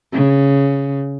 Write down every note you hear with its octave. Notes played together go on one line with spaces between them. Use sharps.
C#3